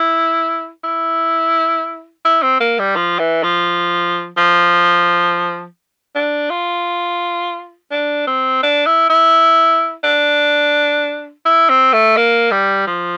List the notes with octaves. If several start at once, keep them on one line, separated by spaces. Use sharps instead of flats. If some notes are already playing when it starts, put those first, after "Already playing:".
Already playing: E4
E4
E4
C4
A#3
G3
F3
E3
F3
F3
D4
F4
D4
C4
D4
E4
E4
D4
E4
C4
A3
A#3
G3
F3